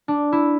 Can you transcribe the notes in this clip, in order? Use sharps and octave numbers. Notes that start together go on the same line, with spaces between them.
D4
E4